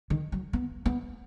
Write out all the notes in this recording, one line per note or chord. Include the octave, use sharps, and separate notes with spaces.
D#3
F#3
B3
B3